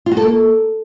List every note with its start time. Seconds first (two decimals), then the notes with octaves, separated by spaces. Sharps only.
0.06 F4
0.12 F#4
0.17 A4
0.22 A#3